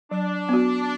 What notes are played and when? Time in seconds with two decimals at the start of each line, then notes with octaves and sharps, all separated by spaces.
0.11 F#3 D4
0.49 B3 F#4